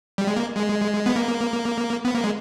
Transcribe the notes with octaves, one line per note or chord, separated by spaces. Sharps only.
G3
G#3
A#3
G#3
B3
A#3
B3
A#3
G#3